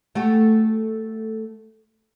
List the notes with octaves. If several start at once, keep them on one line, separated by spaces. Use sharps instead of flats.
A3 F#4 G4